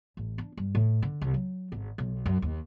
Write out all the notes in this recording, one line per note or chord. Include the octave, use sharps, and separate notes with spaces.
A1
D4
G2
A2
D3
C2
F#3
G#1
B1
F#2
D#2